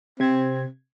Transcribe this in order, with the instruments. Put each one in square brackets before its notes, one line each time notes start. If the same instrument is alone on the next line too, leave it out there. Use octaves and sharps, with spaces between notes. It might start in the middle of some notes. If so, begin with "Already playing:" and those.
[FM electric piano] C3 G#6 [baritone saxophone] C4